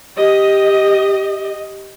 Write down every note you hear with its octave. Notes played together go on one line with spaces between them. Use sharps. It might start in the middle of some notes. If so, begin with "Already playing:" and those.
G4 D#5